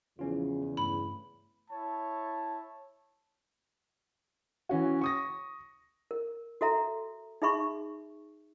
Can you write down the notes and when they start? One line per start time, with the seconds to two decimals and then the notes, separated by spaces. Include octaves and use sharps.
0.19 E2 C#3 F3 C#4 F4
0.77 G2 A3 B5
1.71 E4 C#5 A5
4.69 E3 C#4 F#4
5.01 C#6 D#6 A#6
6.11 A#4
6.61 F#4 A4 E5 A#5
7.42 D#4 G#4 E5 B5 C#6